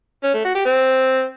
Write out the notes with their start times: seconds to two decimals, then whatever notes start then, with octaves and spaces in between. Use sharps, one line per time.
0.24 C#4
0.34 A3
0.45 F#4
0.55 G4
0.65 C4